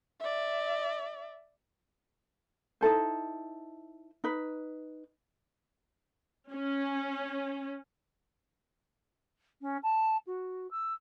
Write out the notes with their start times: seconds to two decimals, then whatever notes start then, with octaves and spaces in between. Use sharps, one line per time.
0.20 D5 E5
2.81 D#4 E4 A4 C5
4.24 D#4 B4
6.53 C#4
9.61 C#4
9.83 A5
10.27 F#4
10.71 E6